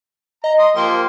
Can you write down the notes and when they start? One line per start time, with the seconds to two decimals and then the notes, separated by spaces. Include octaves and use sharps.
0.44 D#5 A#5
0.59 C6 D#6
0.76 F3 A#3 G4 C6